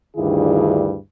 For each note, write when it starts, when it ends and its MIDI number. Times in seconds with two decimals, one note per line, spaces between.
0.16 0.95 38
0.16 0.95 43
0.16 0.95 51
0.16 0.95 64
0.16 0.95 65
0.16 0.95 68